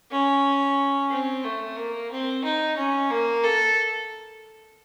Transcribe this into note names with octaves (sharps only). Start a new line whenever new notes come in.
C#4
C4
A3
A#3
C4
D#4
C#4
A#3
A4